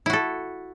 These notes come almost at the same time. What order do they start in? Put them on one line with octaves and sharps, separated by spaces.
E4 F#4 A4